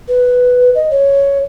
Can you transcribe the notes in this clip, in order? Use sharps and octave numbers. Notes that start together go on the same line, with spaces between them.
B4
D#5
C#5